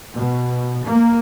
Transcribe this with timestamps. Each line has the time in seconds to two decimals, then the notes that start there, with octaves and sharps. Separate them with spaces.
0.15 B2
0.87 A#3